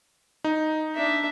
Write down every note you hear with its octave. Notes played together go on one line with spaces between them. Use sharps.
D#4
D4 E5